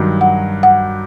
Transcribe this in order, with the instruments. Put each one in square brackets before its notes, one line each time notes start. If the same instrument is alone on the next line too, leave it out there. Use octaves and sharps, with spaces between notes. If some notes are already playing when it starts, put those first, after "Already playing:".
Already playing: [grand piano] G2 D#3 F#3
[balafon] F#5
F#5